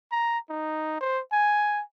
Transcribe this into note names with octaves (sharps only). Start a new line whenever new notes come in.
A#5
D#4
C5
G#5